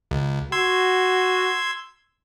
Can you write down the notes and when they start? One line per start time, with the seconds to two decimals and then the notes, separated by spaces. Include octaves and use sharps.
0.11 C#2
0.52 F#4 C6 E6 G#6